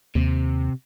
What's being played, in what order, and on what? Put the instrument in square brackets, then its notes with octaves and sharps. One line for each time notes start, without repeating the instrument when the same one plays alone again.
[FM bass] D#2 [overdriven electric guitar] C3